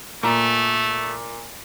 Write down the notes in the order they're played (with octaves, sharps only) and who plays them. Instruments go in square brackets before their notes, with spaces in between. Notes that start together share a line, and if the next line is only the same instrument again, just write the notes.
[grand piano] A#2 A#5 [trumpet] A3